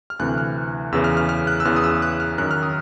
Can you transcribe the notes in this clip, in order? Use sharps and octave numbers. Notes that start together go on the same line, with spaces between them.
F6
D2 C3 E3 F#6
F6
E2 C#3 E3 E6
F6
F6
F6
F#6
E6
E2 C#3 E3 F6
D#6
E6
F#6
F6
F#2 D#3 F#6
F6
D#6